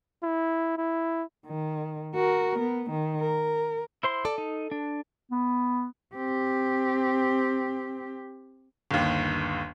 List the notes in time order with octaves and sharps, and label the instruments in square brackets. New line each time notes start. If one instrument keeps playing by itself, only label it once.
[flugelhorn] E4
E4
[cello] D#3
F#4 A#4
B3
D#3
A#4
[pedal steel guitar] E4 C5 C6
[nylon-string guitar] A4 [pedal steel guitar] D5
[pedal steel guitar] D#4
D4
[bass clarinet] B3
[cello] C4 G4
[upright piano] G1 D#2